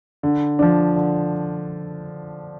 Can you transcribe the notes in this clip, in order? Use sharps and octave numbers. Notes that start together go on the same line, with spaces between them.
D3
F3 D4
D3